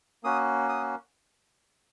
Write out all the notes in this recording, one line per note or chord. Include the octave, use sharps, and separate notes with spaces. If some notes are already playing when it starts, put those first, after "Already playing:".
A#3 C#4 F#4 D#6
D#6